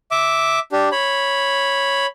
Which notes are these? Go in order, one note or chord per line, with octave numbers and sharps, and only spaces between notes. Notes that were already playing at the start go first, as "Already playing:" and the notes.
E5 D6
D4 G4
C#5 B5